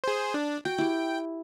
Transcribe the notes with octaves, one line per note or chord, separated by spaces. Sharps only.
G#4 C5
D4
F#4 G5
E4 G4